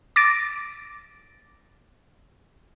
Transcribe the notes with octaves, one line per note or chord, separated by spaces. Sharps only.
D6 A6 A#6 D7